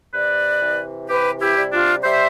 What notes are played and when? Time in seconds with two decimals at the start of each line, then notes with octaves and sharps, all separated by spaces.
0.14 C3 B4 D5
0.62 E3
1.09 C3 G4 B4
1.40 E4 G4
1.56 G3
1.72 D4 F4
2.04 G3 C5 E5